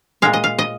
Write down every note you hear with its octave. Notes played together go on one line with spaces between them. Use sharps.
A#2 G#3 F5
D#5
F5
D#5